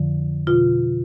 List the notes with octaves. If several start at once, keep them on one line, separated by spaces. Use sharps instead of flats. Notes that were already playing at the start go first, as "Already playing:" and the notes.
Already playing: F2 D3 F3
B2 F4